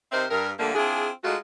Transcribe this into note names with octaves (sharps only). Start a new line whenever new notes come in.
C3 C4 D#4 A#4 C5 E5
G2 A#4
D3 F3 G3 A3 A#3
C4 D4 E4 F4 G#4
G#3 A3 D#4 F4 F#4